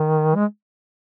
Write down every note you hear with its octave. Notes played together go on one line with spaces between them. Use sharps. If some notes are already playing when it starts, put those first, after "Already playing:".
Already playing: D#3
G#3